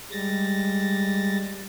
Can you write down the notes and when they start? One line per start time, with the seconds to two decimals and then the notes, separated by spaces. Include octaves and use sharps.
0.11 G3 G#3 A6 A#6